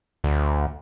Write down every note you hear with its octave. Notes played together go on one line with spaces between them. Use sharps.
D2